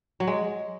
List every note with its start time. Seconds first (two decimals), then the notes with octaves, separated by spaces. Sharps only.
0.20 F#3
0.27 G#3